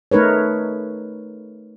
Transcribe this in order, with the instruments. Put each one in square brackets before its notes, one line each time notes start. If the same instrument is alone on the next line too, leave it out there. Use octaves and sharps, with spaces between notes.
[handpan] A3 D#4 A#4 B4 C#5